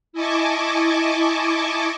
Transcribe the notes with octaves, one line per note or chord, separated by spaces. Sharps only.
E4 D#5 G#5 A5 C#6 D6